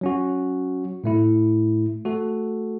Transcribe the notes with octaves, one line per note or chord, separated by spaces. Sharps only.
F#3 C#4 F#4
A2 A3 E4
A3 F#4 A4